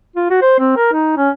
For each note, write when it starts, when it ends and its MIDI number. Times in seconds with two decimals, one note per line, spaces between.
0.16 0.26 65
0.30 0.41 66
0.42 0.57 72
0.59 0.75 60
0.76 0.89 70
0.92 1.16 63
1.17 1.30 61